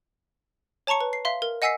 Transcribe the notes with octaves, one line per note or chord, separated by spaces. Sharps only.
C#5 A5 A#5 C#6 C#7
B4
C7
E5 F5 C6
A#4
D#5 F#5 G#5 E6 B6 C7